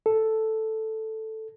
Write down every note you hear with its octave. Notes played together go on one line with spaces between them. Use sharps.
A4